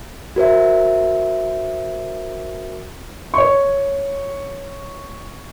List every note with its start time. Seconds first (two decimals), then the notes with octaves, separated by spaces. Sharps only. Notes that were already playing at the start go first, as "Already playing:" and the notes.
0.36 F#4 A#4 C5 E5
3.34 C#5 C#6